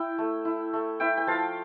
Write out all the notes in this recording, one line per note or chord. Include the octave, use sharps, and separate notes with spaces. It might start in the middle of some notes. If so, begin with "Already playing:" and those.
Already playing: E4 G5
A3
E4
A3
E4 E5 G5
G5
F3 F5 A5